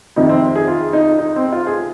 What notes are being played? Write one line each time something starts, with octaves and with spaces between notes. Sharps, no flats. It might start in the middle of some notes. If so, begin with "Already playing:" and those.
F2 C3 D#3 D#4
C4
G#4
F4
D#4
D#4
C4
F4
G#4